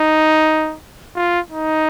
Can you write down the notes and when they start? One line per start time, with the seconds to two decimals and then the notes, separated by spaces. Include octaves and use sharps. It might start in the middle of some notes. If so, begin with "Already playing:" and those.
Already playing: D#4
1.16 F4
1.50 D#4